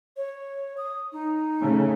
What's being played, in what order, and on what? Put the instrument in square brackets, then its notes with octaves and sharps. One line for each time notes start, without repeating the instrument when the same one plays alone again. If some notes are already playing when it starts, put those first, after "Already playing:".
[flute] C#5
D#6
D#4
[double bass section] C#3 A3